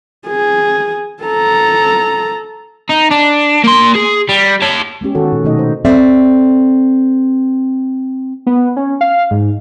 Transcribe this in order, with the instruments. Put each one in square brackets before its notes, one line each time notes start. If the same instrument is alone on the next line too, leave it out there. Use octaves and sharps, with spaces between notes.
[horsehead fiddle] G#4
A4 A#5
[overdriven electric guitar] D#4
D4
A#3 C6
G#4
G3
C#5 A5
[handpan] G#3 B3 C#4 G4
D#3 F#4 A4 C#5
A#2
B2 D#3 A3 D#4 A4 D#5
C5
[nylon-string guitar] C4 A4 D5 E5
[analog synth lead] B3
C#4
F5
G#2